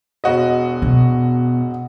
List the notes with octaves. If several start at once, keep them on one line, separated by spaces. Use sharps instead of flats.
E1 F#4 D#5
B2